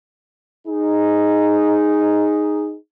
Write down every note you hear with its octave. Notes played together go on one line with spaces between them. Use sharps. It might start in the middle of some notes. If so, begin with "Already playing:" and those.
D#4 G#4